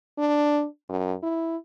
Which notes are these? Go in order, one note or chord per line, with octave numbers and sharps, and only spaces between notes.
D4
F#2
E4